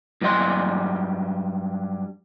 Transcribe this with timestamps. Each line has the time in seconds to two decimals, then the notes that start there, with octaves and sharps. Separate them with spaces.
0.22 G2 F#3 G3 D#5 C6